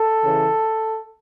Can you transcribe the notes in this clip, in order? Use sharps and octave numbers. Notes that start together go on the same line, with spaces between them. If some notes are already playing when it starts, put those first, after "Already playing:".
Already playing: A4
C#3 E3